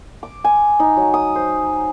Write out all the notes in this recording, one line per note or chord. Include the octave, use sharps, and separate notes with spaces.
D6
G#5
D#4
F#3
D#6
C5